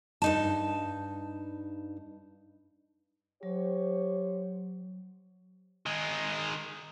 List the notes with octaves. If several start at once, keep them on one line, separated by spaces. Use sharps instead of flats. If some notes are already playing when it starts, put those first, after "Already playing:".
G2 D#4 A5
F#3 G4 C5 C#5
D#3 G#3